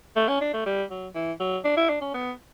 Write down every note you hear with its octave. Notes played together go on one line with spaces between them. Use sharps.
A3
C#4
D4
A3
G3
F#3
E3
F#3
D4
E4
D4
C#4
B3